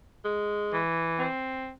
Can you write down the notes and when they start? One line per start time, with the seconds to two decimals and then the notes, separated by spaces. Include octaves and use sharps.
0.24 G#3
0.72 E3
1.19 C4